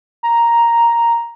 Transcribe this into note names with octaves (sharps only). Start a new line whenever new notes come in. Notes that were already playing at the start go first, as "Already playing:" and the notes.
A#5